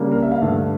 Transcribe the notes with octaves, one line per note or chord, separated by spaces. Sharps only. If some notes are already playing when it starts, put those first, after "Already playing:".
Already playing: C#3 G3 A#3 D4
A#4
E5
F5
G2 D3 A3